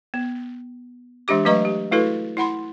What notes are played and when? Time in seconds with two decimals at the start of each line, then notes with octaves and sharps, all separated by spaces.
0.14 B3
1.28 E3 G#3 D4 G4 D6
1.45 F#3 A3 B4 D#5 A#5 C#6
1.65 G4
1.92 A3 E4 F#4 A4 B4
2.37 E4 F#5 B5 C6